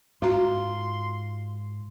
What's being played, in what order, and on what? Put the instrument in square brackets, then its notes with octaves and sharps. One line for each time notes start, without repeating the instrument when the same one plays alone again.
[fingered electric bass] G#2 [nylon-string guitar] F4 [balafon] F#4 A#5 [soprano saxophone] C6